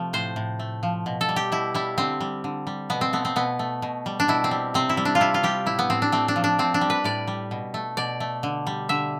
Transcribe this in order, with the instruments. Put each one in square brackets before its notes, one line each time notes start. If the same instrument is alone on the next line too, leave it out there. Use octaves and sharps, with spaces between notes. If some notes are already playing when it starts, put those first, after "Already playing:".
Already playing: [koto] C3 F3 A3
A2 C5
A2
A3
F3
B2
A4
G3
G4
B2 E4
G3 E4
D3 C4
G3
D3
G3
B2 B3
C4
A3 B3
C4
B2 B3
A3
B2
G3
D4
B2 E4
C4
G3
C3 C4
E4
G3
D4
F4
C3 E4
F4
G3 G4
A2 E4
B3
A2 C4
D4
A3 C4
D4
F3
D4
A2 C4
D4
G3
B4
A2 D5
G3
B2
A3
B2 D5
A3
D3
G3
D3 E5